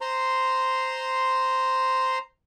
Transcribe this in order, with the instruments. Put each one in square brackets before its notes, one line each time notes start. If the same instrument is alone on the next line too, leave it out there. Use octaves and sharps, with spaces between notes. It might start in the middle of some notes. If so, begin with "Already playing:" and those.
[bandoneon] C5 A#5 C6